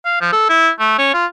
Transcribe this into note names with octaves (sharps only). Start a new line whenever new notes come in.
F5
F3
A4
E4
A3
C#4
F4